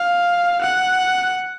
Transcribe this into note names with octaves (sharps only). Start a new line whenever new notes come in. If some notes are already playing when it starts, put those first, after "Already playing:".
Already playing: F5
F#5